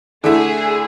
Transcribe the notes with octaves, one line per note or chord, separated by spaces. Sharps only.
D3 A3 E4 G#4